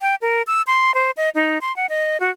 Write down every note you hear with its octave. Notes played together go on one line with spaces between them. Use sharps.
G5
A#4
E6
C6
C5
D#5
D#4
C6
F#5
D#5
F#4